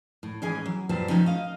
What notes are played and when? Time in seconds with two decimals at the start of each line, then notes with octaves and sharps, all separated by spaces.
0.23 A2
0.42 G#2 E3 C#4 G#4 D#5 G#5
0.65 F#3
0.89 F#2 A#2 G3 B4 C5 A5
1.09 F3 A3 C#4 D#4
1.26 D#5 F5